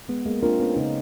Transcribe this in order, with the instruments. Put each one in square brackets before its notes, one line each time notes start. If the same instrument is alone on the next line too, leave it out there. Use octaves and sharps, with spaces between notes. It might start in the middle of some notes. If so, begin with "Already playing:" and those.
[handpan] G#3 [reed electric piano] B3
[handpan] G#3 A#3
[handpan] A#3 C4 [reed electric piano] D4 F4 A#4
[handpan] B3 C#4
[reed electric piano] C#3 [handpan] C#4 D#4